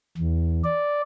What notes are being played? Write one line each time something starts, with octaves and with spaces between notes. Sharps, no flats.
E2
D5